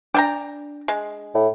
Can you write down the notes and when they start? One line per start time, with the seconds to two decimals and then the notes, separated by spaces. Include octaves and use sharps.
0.14 D4 D5 G5 A#5
0.88 G#3
1.35 A2